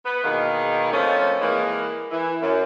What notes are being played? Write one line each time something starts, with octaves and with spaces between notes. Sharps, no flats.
B3 B4
E2 B2 D#3 G#3 A#3 D#4
F3 A3 A#3 C4 C#4
E3 G#3 A#3
E3
F#2